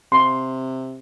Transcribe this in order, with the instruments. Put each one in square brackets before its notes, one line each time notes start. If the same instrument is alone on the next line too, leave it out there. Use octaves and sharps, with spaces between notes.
[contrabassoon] C3 [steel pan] C6